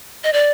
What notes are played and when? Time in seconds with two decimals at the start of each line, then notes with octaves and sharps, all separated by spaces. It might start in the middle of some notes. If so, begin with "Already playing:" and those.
0.24 D#5
0.33 D5